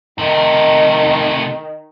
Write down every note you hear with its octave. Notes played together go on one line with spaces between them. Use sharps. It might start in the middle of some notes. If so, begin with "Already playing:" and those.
C3 D#3 A3